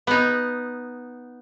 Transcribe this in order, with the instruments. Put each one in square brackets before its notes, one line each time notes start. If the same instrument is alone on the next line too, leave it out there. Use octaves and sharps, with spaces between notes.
[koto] B3 D#4